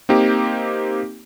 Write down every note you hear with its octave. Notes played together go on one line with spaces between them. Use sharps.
A#3 C4 D#4 G4